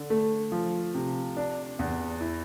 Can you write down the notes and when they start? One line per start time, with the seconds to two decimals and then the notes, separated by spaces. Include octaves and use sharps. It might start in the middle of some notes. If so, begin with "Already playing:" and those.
Already playing: D3
0.10 A3
0.52 F3
0.94 C3
1.37 D4
1.79 E2
2.21 E4